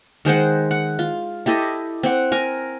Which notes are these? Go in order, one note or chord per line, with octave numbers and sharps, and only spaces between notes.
D#3 G#3 C5 F#5
F#5
F4
E4 G4 A4 D#5
C4 F#5
A#4 G#5